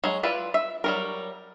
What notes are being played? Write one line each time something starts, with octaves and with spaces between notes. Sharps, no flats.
F#3 G#3
E4 F4 B4 D5
E5
F#3 G3 A#4